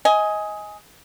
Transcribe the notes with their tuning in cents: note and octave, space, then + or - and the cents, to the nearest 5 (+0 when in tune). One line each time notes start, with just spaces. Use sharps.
D#5 +20 G#5 +0